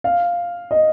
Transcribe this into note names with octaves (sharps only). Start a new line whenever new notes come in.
F5
D#5